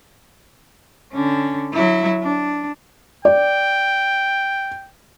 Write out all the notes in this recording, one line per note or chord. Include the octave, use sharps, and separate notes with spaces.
D3 C#4
F#3 E4
D4
D5 G5